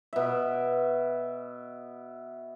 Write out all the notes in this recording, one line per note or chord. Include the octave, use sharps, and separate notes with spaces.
B2 E5